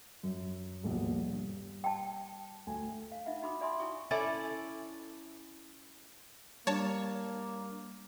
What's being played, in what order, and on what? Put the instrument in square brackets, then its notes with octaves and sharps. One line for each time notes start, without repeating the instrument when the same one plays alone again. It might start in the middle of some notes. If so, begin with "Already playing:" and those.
[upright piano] F#2
D#1 A#1 B2
G2
[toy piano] G5 A5
[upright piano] D2 G#5
[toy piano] F5
D#4 F4 E5 F#5
D#4 F#4 B5 D6 D#6
D5 E5 G#5 B5 C6 D#6
E4 F#4 G5 C#6 D#6
[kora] C#4 E4 A4 D5
[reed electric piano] G3 D4 [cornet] A#3 [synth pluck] C#5 A5